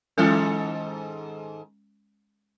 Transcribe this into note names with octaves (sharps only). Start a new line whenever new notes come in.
G#2 D#3 G#3 C#4 A4